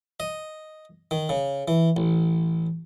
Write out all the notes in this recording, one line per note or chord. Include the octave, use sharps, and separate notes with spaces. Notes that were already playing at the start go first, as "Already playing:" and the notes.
D#5
D#3
C#3
E3
A1